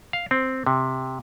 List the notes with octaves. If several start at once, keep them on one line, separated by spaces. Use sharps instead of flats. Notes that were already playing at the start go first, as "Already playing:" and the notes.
F5
C4
C3